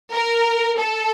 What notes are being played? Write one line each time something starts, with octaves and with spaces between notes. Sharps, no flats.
A#4
A4